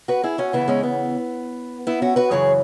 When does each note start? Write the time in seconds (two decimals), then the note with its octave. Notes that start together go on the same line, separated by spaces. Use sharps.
0.08 F#4 B4
0.23 E4 G#4
0.38 C#4 F#4
0.53 E2 C#3 E3 B3 E4
0.68 G#3 C#4
0.83 B3
1.87 B3 E4
2.02 C#4 F#4
2.16 F#4 B4
2.31 F#2 C#3 E3 G#4 C#5